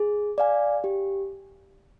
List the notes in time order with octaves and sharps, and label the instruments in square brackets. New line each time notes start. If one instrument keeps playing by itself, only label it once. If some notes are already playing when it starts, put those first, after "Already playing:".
Already playing: [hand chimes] G#4
D5 F5 G#5
G4